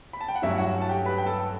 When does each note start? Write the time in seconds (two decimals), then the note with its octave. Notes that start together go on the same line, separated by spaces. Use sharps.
0.13 B5
0.21 A5
0.28 G5
0.35 F#5
0.42 G2 F#3 A3 C#4 E4 E5
0.58 F#4 F#5
0.82 A5
0.89 G4 G5
1.05 B4 B5
1.18 G5
1.26 A4 A5